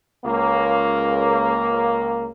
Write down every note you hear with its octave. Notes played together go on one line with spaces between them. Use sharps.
C#2 A#3